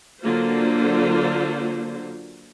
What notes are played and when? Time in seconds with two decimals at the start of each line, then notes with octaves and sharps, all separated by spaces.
0.21 D3 F#3 A#3 F4 C5